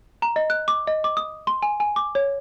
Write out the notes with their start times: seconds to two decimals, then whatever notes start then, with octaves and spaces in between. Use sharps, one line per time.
0.22 A#5
0.36 D#5
0.50 F#6
0.68 D6
0.87 D#5
1.04 D6
1.17 D#6
1.47 C6
1.63 G#5
1.80 G#5
1.96 D6
2.15 C#5